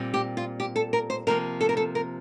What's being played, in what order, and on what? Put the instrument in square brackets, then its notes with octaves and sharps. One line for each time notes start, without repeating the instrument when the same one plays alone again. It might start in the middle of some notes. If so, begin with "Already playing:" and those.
Already playing: [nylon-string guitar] A#2 G3 C4
G4
F4
G4
A4
A#4
C5
C3 F3 A#3 A#4
A4
A#4
A4
A#4